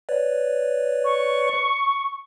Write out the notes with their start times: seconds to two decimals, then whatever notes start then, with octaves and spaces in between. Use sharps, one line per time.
0.09 B4 C#5 D5
1.05 C#6